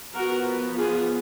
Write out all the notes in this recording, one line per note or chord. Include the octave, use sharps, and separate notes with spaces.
F3 B3 F#4 A#4
F4 G#4